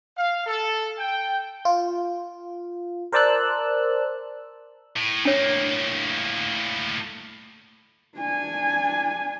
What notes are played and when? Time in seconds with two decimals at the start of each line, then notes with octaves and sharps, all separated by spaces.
0.17 F5
0.47 A4
0.99 G5
1.65 F4
3.13 A#4 C5 D5 A5 E6 F#6
4.96 A2
5.25 A2 A#3 D4 C#5
8.18 D4 G#5